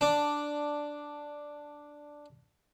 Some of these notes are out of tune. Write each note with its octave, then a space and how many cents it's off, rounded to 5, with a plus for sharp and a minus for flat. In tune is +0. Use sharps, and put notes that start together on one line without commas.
D4 +0